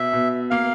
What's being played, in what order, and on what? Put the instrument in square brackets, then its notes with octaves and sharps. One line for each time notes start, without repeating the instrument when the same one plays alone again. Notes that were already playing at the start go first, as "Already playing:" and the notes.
Already playing: [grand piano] B2 [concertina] E5
[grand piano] B2
[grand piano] A#3 [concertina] F5